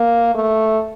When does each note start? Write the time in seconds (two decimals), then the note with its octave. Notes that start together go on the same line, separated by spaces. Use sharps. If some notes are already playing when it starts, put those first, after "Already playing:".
Already playing: A#3
0.35 A3